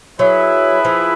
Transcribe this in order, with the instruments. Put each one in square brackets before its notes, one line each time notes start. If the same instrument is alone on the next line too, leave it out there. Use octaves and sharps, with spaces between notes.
[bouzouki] F#3 [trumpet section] E4 G#4 B4 E5
[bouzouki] F3